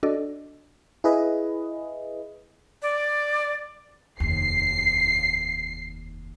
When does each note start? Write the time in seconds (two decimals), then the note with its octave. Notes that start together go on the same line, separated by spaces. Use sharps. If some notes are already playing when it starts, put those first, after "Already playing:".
0.03 D4 F#4 A4 D5 D#5
1.04 E4 G#4 B4 D#5
2.82 D5
4.20 F1 D#2 C7